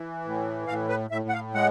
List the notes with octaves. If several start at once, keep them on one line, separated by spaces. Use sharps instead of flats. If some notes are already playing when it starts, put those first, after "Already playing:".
Already playing: E3
A2
A2 F5
B4
A2 E5
F#5
F5
G#3 F#5